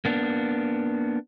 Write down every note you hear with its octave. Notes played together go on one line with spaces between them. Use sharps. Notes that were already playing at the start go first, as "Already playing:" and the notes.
A#3 B3 D4